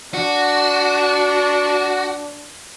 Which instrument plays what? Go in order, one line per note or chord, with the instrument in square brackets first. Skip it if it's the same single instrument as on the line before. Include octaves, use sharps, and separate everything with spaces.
[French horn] D4 [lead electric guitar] F#4